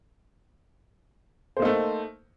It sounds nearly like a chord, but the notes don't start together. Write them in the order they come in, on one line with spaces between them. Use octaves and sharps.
C5 A#3 D#4 A3